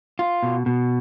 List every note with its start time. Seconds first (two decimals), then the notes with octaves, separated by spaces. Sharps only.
0.19 F4
0.43 B2
0.66 B2